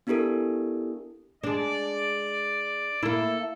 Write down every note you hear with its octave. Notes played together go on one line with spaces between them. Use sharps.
B3 D4 E4 G4 A4 A#4
G#3 D4 D5
A#3 E4 A4